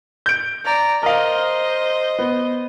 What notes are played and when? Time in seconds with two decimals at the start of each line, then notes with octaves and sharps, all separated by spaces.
0.26 G6 D7
0.65 D5 A#5
1.03 A#4 C5 D#5 F5
2.19 B3